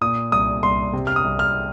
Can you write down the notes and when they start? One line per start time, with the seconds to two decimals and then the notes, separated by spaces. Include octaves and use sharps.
0.01 A#2 D#6
0.32 C2 D#6
0.63 C2 C6
0.93 C3
1.07 F6
1.16 D#6
1.24 C2
1.39 F6